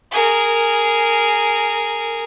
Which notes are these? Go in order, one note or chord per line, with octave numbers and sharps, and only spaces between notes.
G#4 A#4